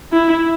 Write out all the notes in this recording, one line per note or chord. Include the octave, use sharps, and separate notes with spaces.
E4